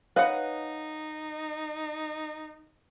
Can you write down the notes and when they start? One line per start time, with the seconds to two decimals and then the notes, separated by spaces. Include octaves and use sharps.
0.16 D#4 B4 C#5 D#5 F5 F#5